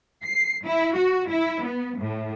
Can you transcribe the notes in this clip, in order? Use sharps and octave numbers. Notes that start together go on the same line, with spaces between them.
C7
E4
F#4
E4
B3
A2